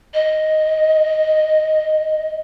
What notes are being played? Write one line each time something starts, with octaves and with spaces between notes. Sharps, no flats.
D#5